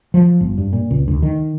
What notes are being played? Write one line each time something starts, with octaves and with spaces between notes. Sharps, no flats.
F3
G1
G2
A#2
C#2
D2
D#3